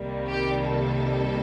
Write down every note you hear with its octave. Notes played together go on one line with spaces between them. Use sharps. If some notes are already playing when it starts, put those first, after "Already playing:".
Already playing: C2 C3 D#3 G3 A#3
G4
A4